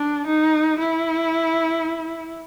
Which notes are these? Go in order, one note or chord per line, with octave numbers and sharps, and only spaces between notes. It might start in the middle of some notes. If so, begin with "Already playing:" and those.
Already playing: D4
D#4
E4